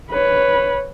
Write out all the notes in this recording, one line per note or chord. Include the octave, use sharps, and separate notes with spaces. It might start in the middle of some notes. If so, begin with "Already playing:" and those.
B4 C#5